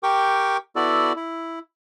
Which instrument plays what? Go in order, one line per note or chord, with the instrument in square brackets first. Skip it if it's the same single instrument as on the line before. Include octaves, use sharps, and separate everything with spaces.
[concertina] G4 A#4 G5 C#6 D6
B3 E4 F#4 A4 D5
E4